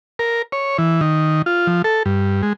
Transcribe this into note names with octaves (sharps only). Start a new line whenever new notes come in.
A#4
C#5
E3
D#3
F4
F3
A4
G2
G#3